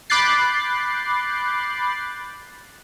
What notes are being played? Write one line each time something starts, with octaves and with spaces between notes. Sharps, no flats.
B5 D6 F#6 G6 A6 C7